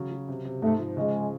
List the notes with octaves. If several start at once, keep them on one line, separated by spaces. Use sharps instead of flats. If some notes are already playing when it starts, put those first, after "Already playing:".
Already playing: C#3 F#3
F#3
C3
C3
G#2 A3
F3
C#3 G#3